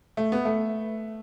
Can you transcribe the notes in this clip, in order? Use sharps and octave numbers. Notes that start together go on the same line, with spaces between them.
A3
B3
A3